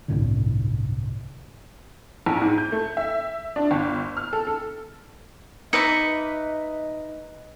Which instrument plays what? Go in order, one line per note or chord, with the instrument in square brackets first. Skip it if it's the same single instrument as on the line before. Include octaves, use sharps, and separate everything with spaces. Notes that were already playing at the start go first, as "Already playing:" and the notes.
[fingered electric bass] G1 C2 A2 D3
[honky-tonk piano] A#1
G#2
G6
A3
E5
D4
G1
F6
A4
A4
[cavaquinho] D#4 E5 [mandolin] B4 D6 [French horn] D#5 [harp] C#7